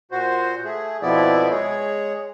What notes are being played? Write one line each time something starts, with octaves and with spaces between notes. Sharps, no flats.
A#2 F#4 C5
A3 G#4
F2 B2 F3 B3 E4 D5
G#3 G#4 C#5